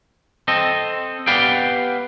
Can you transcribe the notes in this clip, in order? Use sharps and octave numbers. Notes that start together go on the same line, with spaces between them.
C4 A4 D#5
B3 G4 B4 D5 F5 G5